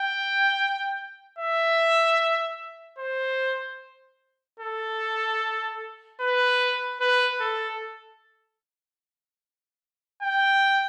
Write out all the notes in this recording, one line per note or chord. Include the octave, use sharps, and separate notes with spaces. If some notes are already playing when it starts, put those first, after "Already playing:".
Already playing: G5
E5
C5
A4
B4
B4
A4
G5